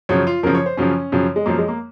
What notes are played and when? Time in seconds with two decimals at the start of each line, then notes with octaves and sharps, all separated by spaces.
0.09 F#2 C#3 F3 C#5
0.27 F4
0.43 F#2 C#3 F3 A#4
0.55 C#5
0.66 C5
0.77 F#2 C#3 F3 C#4
1.12 F#2 C#3 F3
1.36 G#3
1.46 F#2 F3 A#3
1.58 G#3
1.68 A#3